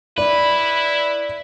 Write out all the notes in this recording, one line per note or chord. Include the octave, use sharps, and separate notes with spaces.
E4 B4 D5